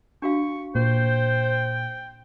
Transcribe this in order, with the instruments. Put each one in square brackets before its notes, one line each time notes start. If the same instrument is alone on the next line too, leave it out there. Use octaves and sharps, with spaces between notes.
[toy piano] D4 F#4 F5 [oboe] C#6
[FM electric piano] A#2 [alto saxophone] C5 [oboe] G5